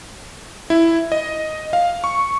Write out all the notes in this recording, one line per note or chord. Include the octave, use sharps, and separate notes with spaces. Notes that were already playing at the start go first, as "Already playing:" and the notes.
E4
D#5
F5
C#6